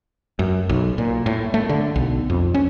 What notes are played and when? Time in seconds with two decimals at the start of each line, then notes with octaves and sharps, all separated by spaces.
0.39 F#2
0.69 B1
0.98 A#2
1.26 A2
1.54 A3
1.69 D3
1.96 B1
2.30 F2
2.54 C#4